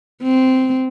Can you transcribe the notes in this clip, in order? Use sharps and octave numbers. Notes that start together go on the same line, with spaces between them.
C4